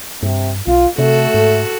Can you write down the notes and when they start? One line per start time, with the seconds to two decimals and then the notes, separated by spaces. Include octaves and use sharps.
0.23 G2 C3
0.67 B1 F4
0.98 C3 A3 F#4 A4
1.34 G#2